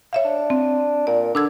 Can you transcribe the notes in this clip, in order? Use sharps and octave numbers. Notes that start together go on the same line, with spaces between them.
C#5 E5 F5
D4
C4
A#2 D5
D3 D4 E6 G#6